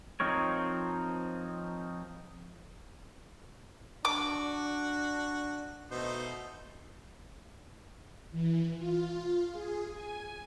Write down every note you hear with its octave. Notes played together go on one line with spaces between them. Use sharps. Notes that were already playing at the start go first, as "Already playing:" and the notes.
F3 C4 D#4 A#4 C#5
D4 F#4 D6
B2 A3 D#4 C5
E3
F4
G#4
G#5